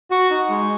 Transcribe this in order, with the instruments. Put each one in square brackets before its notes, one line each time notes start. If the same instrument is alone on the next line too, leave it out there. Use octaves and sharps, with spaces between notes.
[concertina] F#4 C#6
D#4
G#3